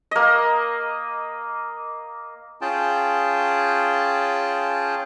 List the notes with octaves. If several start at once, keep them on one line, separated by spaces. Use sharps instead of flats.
A#3 D#5
C#4 F4 G#4 G5 A5